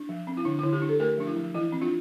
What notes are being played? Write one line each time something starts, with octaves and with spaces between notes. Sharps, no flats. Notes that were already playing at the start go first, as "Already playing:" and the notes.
Already playing: D4
F3
C4
E4
D3 D4
D3 E4
E4 G4
D4
A4
A3 G4 A#4
F3 D4
E4
F3
E3 E4
C4
D4 F4